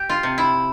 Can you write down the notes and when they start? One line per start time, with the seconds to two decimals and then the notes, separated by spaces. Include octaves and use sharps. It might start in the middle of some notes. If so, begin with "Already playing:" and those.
Already playing: G4
0.09 F4
0.23 C3
0.38 E4